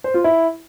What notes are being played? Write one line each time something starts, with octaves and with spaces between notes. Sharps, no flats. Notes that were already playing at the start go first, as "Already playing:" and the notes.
C5
F4
E4